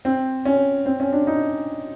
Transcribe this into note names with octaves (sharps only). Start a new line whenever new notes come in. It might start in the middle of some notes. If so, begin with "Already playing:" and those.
C4
C#4
C4
C#4
D4
D#4